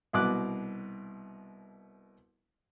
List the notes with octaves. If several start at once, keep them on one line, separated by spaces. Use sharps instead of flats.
C2 B2 D6 F#6